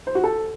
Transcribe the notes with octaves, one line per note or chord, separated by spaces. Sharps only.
C5
F#4
A4